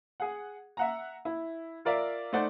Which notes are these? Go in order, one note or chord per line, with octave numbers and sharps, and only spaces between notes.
G#4 F#5
E5 F#5 A#5
E4
F4 A#4 D5 E5 F5
A3 D#4 C5 D5 F#5